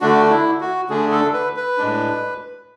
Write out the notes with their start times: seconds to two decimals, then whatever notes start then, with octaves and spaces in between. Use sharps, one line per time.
0.01 D3 A3 D4 F#4
0.30 E4
0.61 F#4
0.89 D3 A3 D4 G#4
1.12 A4
1.33 B4
1.56 B4
1.78 A2 G#3 D4